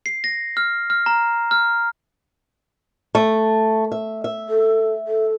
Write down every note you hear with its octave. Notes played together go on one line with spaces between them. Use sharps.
C7
A#6
F6
F6
A#5
F6
A3
E5
E5
A4
A4